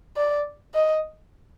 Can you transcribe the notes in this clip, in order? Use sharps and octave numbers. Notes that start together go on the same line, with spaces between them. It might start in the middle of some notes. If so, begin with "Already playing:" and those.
D5
D#5